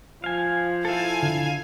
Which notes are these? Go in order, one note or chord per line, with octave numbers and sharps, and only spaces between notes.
F3 F5 G#5
E4 A4 F5 G#5
D3